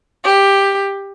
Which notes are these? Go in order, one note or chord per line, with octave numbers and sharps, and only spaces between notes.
G4